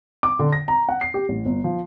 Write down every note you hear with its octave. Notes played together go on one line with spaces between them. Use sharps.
D6
D3
A#6
A#5
F#5
C7
G4
A1
G1
F3